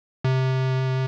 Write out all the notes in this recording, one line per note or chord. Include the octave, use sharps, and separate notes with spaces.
C3